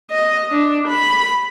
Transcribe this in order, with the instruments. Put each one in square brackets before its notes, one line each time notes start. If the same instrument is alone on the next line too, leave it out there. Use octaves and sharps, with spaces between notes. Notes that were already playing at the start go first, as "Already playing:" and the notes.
[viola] D#5
D4
B5